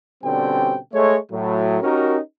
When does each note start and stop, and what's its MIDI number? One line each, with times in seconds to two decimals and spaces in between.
0.24 0.77 47
0.24 0.77 50
0.24 0.77 55
0.24 0.77 60
0.24 0.77 61
0.24 0.77 79
0.93 1.17 56
0.93 1.17 57
0.93 1.17 73
1.31 1.78 45
1.31 1.78 54
1.81 2.18 61
1.81 2.18 63
1.81 2.18 66
1.81 2.18 67
1.81 2.18 70